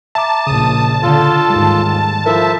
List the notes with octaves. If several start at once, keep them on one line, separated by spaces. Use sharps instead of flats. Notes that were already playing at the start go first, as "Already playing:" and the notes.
E5 A5 A#5 D6
A#1 C#3 D#6
D3 F4 A4
D#2 G#2 G3
F3 E4 A4 A#4 E5